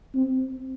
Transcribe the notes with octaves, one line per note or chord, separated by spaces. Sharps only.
C4